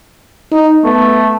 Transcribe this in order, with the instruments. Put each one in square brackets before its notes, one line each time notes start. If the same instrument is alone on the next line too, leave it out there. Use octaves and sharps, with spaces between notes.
[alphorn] D#4
[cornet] A3 [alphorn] B3